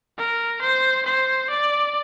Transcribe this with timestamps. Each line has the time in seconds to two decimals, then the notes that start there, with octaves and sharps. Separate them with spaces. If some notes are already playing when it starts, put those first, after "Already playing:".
0.18 A#4
0.62 C5
1.05 C5
1.50 D5